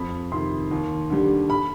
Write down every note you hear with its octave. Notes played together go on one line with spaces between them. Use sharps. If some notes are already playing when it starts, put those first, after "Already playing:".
Already playing: F2 B5
C3 D#3 C6
D#2
D3 G3
B5